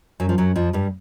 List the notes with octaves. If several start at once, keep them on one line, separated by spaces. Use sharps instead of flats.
F#2 F#3
F3
F#2 F#3
F2 F3
G2 G3